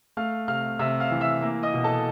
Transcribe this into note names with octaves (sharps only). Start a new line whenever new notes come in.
A3 F5 F6
C3 F5 F6
C3 E5 E6
F5 F6
E3
E5 E6
A#3
D#5 D#6
B2
A4 A5